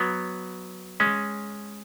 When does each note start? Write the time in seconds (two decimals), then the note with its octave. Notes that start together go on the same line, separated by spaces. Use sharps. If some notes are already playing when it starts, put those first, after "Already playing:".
Already playing: F#3 B3
1.00 G#3 C#4